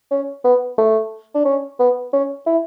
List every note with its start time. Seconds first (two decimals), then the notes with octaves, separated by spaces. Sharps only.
0.11 C#4
0.44 B3
0.78 A3
1.35 D4
1.45 C#4
1.79 B3
2.13 C#4
2.47 E4